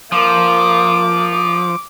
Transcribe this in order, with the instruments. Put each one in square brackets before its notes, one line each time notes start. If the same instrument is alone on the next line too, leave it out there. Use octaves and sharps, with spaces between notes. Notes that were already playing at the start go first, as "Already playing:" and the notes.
[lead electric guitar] F3 [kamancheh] A#3 D6
[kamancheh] D6